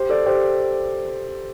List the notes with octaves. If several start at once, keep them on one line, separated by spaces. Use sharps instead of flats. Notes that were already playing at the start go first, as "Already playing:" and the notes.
Already playing: G4 C5
A4 D5
G4 C5